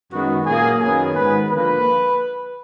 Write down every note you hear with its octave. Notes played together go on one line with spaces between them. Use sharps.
F#2 D#3 G#3 B3 F#4
A#2 F#3 A#3 G#4
F#2 D#3 F#3 B3 G#4
G#2 D#3 G#3 B3 B4
D3 F3 A#3 B4